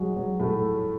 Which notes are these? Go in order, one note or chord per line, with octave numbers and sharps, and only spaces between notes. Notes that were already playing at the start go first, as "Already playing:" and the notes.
Already playing: F#3 G#3
F#3
A2 A3